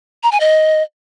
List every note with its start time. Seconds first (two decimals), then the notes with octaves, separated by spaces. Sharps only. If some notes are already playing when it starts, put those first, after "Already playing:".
0.23 A#5
0.32 G#5
0.40 D#5